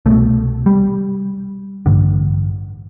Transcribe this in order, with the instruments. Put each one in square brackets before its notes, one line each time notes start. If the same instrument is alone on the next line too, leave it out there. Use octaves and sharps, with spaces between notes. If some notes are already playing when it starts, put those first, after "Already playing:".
[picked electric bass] C2 B2 A3
G3
A1 G2 D3